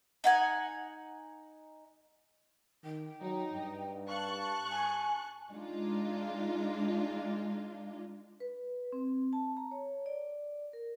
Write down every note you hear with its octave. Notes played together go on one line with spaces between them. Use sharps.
D#4 F#5 G#5
D#3 G5
F#3 D#4
G2
F5 A5 C#6 F#6
G#5
G#3 D4 D#4 F4
B4
C4
A5
A#5
C#5
D5
A#4